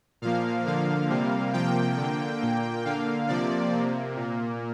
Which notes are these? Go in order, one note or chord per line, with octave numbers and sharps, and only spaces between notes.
A#2 F3 A#3 F5
D3 F3 A#3 F5
C3 G3 A#3
C3 F3 A#3 G5
D3 A#3
A#2 A#3
D3 A#3 F5
C3 F3 A#3 D5
C3 A#3
A#2 A#3